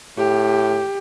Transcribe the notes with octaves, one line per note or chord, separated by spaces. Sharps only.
A2 G4